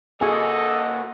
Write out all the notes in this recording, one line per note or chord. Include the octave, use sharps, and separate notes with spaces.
A#3 F#4 G#4 A4 D#5 G#5